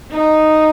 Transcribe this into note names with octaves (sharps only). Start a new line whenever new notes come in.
D#4